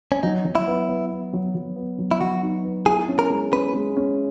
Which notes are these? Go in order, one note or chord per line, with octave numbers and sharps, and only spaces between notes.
C#4
F#3 D#4
F#3
E4
B3
B3
B3
F#3
F#3
B3
F#3
E4
F#3 F#4
D#4
B3
E4 G#4
C#4
A#4
G#3
C#4 B4
G#3
C#4